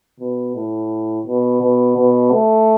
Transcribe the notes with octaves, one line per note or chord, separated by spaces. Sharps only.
B2
A2
B2
B2
B2
A3